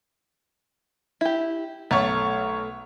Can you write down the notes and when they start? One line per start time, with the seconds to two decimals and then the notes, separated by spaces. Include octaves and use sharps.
1.21 E4 G4
1.91 B1 A3 C#5